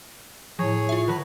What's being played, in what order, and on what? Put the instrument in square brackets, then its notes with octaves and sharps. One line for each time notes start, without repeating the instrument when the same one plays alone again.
[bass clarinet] A2 [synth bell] F3 [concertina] G#4 C#5
[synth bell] F4 E5
[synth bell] D3 F3 A#6 [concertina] B4